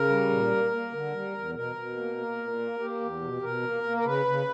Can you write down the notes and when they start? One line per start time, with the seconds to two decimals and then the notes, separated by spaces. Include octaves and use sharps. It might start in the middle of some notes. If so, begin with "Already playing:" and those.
Already playing: C#3 A#4
0.09 G3
0.30 A#2
0.51 A#3
0.71 A#3
0.92 D3
1.13 G3
1.34 E2
1.55 B2 A#4
1.76 B2
1.96 A#3
2.17 A#3
2.38 A#2
2.59 A#3
2.79 A#3 G4
3.00 E2
3.21 B2
3.42 B2 A#4
3.63 A#3
3.83 A#3
3.97 A#4
4.04 C#3 B4
4.25 C#3